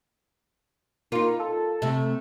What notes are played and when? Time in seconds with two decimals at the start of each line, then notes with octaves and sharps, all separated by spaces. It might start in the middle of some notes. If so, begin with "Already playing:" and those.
1.12 A#3 D#4 F4
1.39 A4
1.82 C3 A3